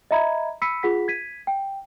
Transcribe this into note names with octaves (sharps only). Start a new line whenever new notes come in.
D#5 E5 A#5 B5 G#6
B5 E6 B6 C#7 D#7
F4 G#4 F#5 B6
G#6 B6 D#7
G5